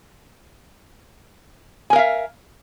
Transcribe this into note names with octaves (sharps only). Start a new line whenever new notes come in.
A#4 E5 F5 G#5